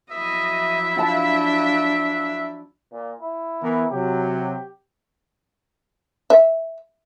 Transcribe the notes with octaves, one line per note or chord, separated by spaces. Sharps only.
F3 F#3 E4 D#5 E5
D4 F4 F5 A5
A#2
E4
E3 B3 A#4
C3 F#3 G4
E5